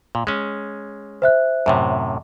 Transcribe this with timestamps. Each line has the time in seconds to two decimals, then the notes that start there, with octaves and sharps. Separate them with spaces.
0.15 A#2
0.27 G#3 C#4
1.22 C5 E5 F#6
1.66 F#2 A2 C3